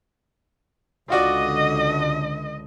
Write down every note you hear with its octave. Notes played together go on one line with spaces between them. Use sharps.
C#2 D3 F4 F#4 D5 D#5